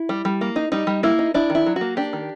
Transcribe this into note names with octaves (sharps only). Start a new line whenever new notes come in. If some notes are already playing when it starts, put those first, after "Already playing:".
Already playing: E4
G3
G3
A#3
D#4
G3 D#4
G3
A#3 E4
D#4
D4 E4
D#3
E4
F#3
F#4
A#3
D4 G4
D#3